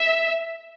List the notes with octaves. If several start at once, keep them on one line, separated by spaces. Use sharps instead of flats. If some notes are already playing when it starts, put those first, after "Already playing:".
Already playing: E5